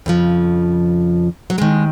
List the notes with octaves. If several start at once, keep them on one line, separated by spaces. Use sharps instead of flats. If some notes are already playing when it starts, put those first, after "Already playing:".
F2 C#3 F3
F#3
D#2 D#3 G#3